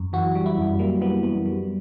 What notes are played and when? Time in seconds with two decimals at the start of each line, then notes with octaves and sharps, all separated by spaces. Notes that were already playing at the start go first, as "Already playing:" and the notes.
Already playing: F#2
0.13 E3 F#4
0.35 G3
0.46 E4
0.57 F#2
0.79 G3 A#3
1.01 G3 B3
1.23 F#2 B3
1.46 G3